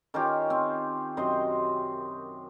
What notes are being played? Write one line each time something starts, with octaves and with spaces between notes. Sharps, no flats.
D#3 C#4 F4 G4
C4
F#2 C3 C5 D#5